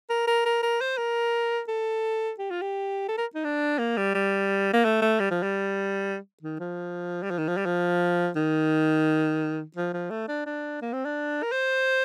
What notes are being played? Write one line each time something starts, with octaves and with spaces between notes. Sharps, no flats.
A#4
A#4
A#4
A#4
C5
A#4
A4
G4
F4
G4
A4
A#4
D#4
D4
A#3
G3
G3
A#3
A3
A3
G3
F3
G3
D#3
F3
G3
F3
D#3
F3
G3
F3
D#3
F3
F3
A3
D4
D4
A#3
C4
D4
A#4
C5